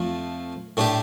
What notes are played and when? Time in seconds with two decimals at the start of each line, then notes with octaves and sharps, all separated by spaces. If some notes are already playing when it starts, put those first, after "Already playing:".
Already playing: F2 F3 A3 F4
0.77 A2 A3 D4 G4